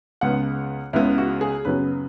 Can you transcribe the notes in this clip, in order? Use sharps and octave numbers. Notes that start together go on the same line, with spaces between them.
C#2 C#3 G#3 B3 F#5
C#2 C#3 G#3 B3 E4
F#4
G#4
F#2 C#3 F#3 B3 B4